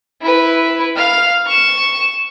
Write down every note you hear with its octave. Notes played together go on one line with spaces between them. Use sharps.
E4 B4
F5 F6
C#6 E7